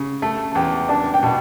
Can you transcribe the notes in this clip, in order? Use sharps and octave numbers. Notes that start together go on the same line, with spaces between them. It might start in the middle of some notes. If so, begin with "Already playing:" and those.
Already playing: C#3
A3 A5
A5
E2 G5
D4 A5
G5
B2 A5